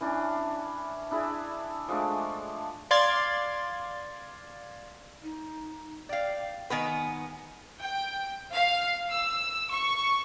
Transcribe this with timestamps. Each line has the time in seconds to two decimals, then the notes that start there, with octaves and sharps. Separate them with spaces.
0.01 E3 C#4 D4
1.11 D4 E4 G#4 E5
1.88 F3 G#3 A3 D4
2.91 D5 F5 C6 G#6 A6
5.23 D#4
6.09 D5 F5 G5
6.70 D#3 B3 B4 G#5
7.79 G5
8.52 F5
9.11 E6
9.70 C#6